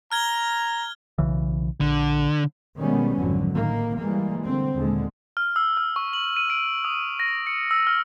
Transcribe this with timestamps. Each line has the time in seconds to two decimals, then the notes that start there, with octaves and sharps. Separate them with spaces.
0.12 A#5 F6 G#6 G7
1.18 B1 C#3 E3
1.81 A#1 D3
2.79 B2 D#3 G3 G#3 B3 C#4
3.18 G#1 F2 D3 F#3
3.50 A2 D#3 A#3
3.97 E3 G3 G#3 A#3
4.44 D3 C4
4.74 D#2 A#2 D3 G#3
5.37 F6
5.56 E6
5.77 F6
5.96 C#6
6.13 F#7
6.37 D#7
6.50 D7
6.85 D#6
7.20 A#6
7.47 C#7
7.71 E6
7.87 F6